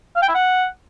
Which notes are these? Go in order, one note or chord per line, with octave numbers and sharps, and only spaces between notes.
F5
G5
E4
F#5